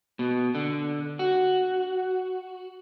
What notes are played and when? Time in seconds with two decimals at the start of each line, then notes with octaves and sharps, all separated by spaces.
0.19 B2
0.55 D3
1.19 F#4